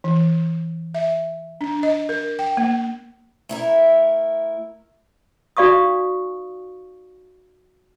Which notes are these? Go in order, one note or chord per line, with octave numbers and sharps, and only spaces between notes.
E3
E5
D4
D#5
A#4
G5
A#3
A3 E4 A#4
D#4 F#4 D5 F5 C#6 D#6